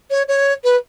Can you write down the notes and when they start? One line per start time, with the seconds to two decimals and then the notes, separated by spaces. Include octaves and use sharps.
0.10 C#5
0.28 C#5
0.64 B4